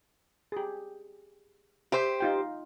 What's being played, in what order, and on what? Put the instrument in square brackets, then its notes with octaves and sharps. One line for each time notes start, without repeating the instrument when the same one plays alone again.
[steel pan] G4 G#4
[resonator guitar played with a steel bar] G4 C5 [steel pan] E5
[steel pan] D#4 F4 G5